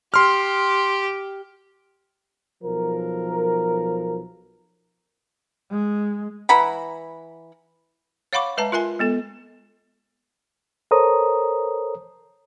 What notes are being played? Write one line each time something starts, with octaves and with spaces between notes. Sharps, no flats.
G4 C6 F6
B1 F3 A#4
G#3
E3 F#5 A#5 B5
C#5 F5 F#5 B5 C#6 D6
G#3 B4 E5 A5 A#5
F4 A#4 E5 G#5 C6
G#3 B3 A4
A4 A#4 C5 C#5 A#5 D#6